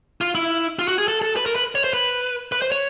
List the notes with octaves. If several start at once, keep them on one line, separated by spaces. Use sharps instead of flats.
F4
E4
F4
F#4
G#4
A4
A4
B4
A#4
B4
C#5
C5
B4
B4
C5
C#5